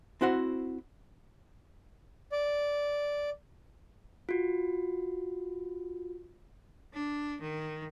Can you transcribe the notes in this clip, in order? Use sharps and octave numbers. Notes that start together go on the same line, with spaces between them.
C4 E4 F#4 C5 F#5
D5
F4 F#4
D4
D#3